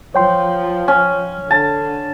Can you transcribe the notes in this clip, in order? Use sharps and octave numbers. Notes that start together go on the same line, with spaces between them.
F3 C#5 G5 C6
C#4
D3 A5